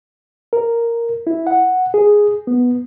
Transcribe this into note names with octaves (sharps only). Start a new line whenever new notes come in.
A#4
E4
F#5
G#4
B3